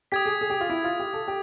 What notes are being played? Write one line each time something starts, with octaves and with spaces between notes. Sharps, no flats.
G4 D#6 G#6 B6
G#4
G#4
G4
F4
E4
F4
G4
A4
G4